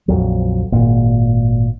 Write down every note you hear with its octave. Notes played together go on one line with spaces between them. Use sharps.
A#1 F2 F#3
G#1 A#2